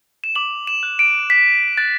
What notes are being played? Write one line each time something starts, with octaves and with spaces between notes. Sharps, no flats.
E7
D6 F#7
E7
F#6
D7
D6 B6
F#6 A6